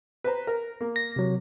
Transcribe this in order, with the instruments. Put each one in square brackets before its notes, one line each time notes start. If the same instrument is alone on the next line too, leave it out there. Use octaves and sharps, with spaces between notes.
[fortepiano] B4 C5 A#5
A#4
A#3
[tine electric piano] A#6
C3 F#3